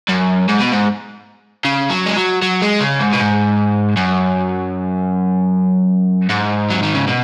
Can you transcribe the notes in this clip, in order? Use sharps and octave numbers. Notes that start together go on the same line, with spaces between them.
F#2
G#2
B2
G#2
C#3
F#3
G#3
F#3
F#3
G#3
C#3
G#2
B2
G#2
F#2
G#2
F#3
D#3
C#3
B2